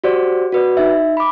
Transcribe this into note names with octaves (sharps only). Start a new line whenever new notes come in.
F#4 G4 C5 D5
F#4 B4 D5
D#4 E5
B5 D6